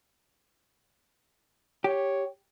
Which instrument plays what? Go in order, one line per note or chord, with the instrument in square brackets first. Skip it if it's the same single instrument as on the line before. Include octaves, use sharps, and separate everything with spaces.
[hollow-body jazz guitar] G4 [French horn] C#5